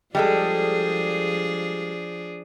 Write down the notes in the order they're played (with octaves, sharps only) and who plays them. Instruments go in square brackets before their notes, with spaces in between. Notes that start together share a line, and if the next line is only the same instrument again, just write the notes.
[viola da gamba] F3 D4 G#4 [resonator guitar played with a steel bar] G3 G#3 A4